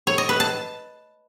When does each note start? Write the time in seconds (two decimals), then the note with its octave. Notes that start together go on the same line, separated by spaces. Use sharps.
0.07 C#5
0.18 D#5
0.29 B4
0.40 A5